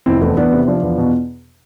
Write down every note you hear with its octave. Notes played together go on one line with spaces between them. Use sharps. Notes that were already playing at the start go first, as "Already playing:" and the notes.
F1 C4 E4
E2 A3 C4
E2 B3 D4
C3
F3 D4 F4
E2
B2